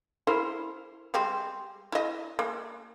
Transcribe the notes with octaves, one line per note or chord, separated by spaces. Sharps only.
E4 A#4 C5
G3 G#3 C4
E4 D#5
A#3